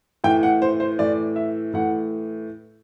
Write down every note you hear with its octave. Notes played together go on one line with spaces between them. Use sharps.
A2 E3 G5
F#5
C5
C5
A2 E3 D5
E5
A2 E3 F#5